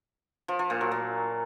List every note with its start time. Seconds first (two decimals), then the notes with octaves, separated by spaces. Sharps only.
0.48 F3
0.59 F3
0.70 A#2
0.81 F#3
0.92 A#2